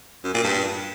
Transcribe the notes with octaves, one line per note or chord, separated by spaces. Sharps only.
F#2
A#2
G2